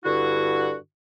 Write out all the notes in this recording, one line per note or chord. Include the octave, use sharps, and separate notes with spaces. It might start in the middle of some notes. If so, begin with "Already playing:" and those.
G2 D3 E4 F#4